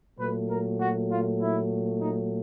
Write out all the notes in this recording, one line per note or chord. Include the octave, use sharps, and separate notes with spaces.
A#2 F#3 A3 B4
A#4
F#4
F4
E4
D#4